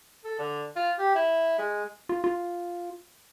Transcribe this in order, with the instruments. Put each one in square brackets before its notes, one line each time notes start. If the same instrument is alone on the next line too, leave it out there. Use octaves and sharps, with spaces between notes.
[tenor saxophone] A4
D3
F4
G4
E4
G#3
[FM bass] F4
F4